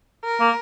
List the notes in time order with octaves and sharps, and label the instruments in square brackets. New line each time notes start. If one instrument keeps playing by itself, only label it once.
[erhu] A#4
[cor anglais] A#3